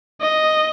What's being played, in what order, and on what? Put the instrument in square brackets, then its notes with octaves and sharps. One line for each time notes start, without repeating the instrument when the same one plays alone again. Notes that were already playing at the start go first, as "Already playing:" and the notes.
[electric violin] D#5